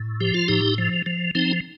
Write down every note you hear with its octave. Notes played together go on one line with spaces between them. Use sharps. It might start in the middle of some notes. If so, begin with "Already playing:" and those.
Already playing: A2
F3 G4
F4
A2 D#4 G4
F3
F3
F3 C4 D#4